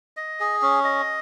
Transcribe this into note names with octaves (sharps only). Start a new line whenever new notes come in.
D#5
G#4
C#4
D#5